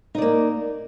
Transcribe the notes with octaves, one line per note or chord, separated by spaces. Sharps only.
A#3 D#4 D5